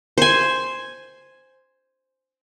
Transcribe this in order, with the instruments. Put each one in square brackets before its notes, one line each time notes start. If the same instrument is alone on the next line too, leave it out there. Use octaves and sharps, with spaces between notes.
[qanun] C5 G#5